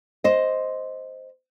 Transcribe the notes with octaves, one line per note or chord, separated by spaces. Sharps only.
C5 D#5